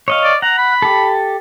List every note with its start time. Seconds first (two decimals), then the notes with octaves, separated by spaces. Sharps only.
0.08 C#5 D#5 F5
0.24 D5
0.42 F#5 A#5
0.58 B5
0.82 G4 A4